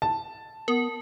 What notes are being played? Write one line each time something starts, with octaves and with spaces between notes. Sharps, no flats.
A5
B3 A#4